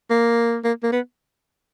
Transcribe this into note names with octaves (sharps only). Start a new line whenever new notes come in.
A#3
A#3
A#3
B3